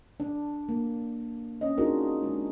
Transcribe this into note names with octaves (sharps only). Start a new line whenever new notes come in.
D4
A#3
C4 C#4 D#5
D4 D#4 F4 F#4 G#4 A#4
G#3 D4